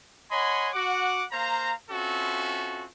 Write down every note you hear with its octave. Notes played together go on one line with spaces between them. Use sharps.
C#5 D#5 F#5 G#5 B5 C6
F#4 F#5 D6
A#3 C5 F5 A#5
C4 C#4 F4 F#4 A4 E5